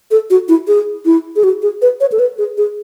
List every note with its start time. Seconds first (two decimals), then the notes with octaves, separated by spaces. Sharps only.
0.11 A4
0.30 F#4
0.49 E4
0.68 G#4
1.05 E4
1.36 G#4
1.44 F#4
1.62 G#4
1.82 B4
2.00 C#5
2.12 A4
2.19 B4
2.38 G#4
2.58 G#4